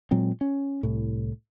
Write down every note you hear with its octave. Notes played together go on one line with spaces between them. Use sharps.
A#2 F#3 G#3 C4
C#4
C2 A2